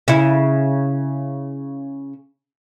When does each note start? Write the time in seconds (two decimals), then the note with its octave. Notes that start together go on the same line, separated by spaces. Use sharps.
0.08 C#3 E4